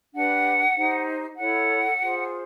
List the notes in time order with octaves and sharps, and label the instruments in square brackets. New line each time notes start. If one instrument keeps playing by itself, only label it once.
[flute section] D4 G4 B4 F#5
D#4 G4 C5
E4 A4 C#5 F#5
F4 G#4 C5